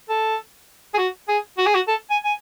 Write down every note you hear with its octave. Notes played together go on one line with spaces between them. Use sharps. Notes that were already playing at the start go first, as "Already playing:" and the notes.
A4
G#4
F#4
G#4
F#4
G#4
F#4
A4
G#5
G#5